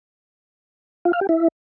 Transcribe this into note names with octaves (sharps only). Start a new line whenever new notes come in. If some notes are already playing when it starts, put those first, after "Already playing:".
F4
F5
G4
E4